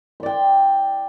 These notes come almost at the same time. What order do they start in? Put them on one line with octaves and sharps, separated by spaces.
C6 D5 G5